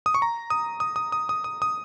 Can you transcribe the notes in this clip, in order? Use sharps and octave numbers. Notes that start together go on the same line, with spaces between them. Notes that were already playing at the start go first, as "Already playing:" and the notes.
D#6
C#6
A#5
D#6
D#6
D#6
D#6
D#6
D#6
D#6